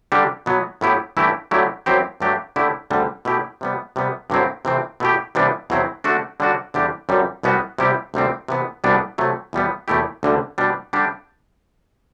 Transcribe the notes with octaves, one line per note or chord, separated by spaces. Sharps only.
D3 G3 D4 G4
B2 F#3 B3
A2 F#3 B3 E4 G4
G2 E3 A3 E4 G4
D3 F#3 A3 E4 G4
F#2 F#3 C4 E4 G4
G2 F#3 A3 D4 G4
D3 A3 E4 G4
D2 D3 G3 C4
B2 A3 E4 G4
C3 G3 B3
C3 G3 B3
G2 D3 F#3 C4 E4
C3 E3 A3 C4
B2 A3 E4 G4
C3 E3 G3 B3 D4
E2 B2 F#3 C4 E4
D3 A3 D4 F#4
D3 G3 D4 F#4
E2 D3 G3 D4 G4
F#2 D3 G3 C4
C2 B2 G3 B3 F#4
C3 G3 B3 E4 G4
D2 C3 G3 C4
C3 E3 B3
C2 B2 G3 B3 D4
C3 F#3 A3
E2 B2 G3 B3
E2 B2 A3 E4 G4
D2 D3 G3
B2 G3 D4
D3 G3 D4 G4